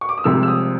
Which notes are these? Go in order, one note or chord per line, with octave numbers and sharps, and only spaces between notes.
C#6
D6
D#6
C2 C3 F3 G#3 E6
E6
D#6